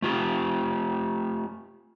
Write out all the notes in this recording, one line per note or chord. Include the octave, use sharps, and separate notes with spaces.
A3 F4 G4